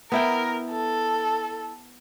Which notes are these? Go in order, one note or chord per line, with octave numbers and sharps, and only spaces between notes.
B3 E4 A#4 G5
A4